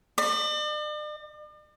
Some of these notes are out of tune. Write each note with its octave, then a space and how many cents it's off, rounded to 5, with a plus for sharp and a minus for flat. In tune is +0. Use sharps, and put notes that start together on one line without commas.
D5 +45